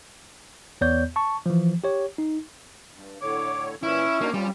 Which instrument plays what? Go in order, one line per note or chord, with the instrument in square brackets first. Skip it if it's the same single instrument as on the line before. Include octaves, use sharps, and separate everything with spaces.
[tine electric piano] E2 B3 C#5 D5 G6
A5 C#6
E3 F3
G4 C#5
D#4
[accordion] G2
[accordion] A2 D3 C#5 [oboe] D6
[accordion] A#2 E3 [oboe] C#4 [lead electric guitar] E4
[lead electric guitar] A#3 [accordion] D4 D#4 F#4
[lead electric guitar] G3 [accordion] C4 C#4 F4